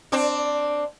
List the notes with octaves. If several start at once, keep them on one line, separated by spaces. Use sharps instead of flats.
C4 D4